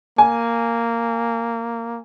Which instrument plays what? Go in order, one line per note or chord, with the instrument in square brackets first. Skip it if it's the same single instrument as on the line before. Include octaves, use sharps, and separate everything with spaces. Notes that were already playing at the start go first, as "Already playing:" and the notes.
[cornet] A#3 [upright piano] G#5